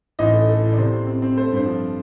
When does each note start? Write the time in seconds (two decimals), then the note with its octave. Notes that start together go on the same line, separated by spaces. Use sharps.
0.19 A1 D#4 D#5
0.33 A3
0.49 A3
0.63 A2
0.73 D5
0.78 C3 C5
0.93 C4
1.07 C4
1.22 C4
1.37 A3 C5
1.52 G2 C5
1.66 F3